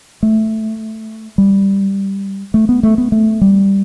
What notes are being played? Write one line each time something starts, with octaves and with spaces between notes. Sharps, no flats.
A3
G3
A3
B3
A3
B3
A3
G3